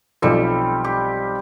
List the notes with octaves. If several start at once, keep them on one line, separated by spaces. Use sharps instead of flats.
B1 F3 G3 C4 A4
G4